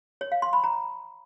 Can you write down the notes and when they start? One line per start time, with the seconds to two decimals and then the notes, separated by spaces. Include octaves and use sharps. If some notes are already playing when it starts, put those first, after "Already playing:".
0.21 C#5
0.32 F5
0.42 C6
0.53 B5
0.64 A#5